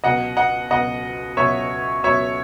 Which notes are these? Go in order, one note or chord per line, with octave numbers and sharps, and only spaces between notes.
C#2 B2 F#3 D#5 F#5
D#5 F#5
C#2 B2 F#3 D#5 F#5
C#2 B2 F#3 C#5 E5
C#2 B2 F#3 C#5 E5